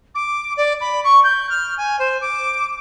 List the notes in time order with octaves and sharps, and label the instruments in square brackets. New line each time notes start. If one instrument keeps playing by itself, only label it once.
[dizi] D6
D5
B5
C#6
G6
F6
G#5
C5
D6